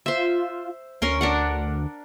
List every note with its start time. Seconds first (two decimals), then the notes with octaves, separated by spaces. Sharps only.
0.06 F4 C5 E5
1.02 D2 C#4 A#4 C6
1.21 D4 A#4 F#5